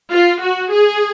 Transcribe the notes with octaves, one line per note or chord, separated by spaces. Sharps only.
F4
F#4
G#4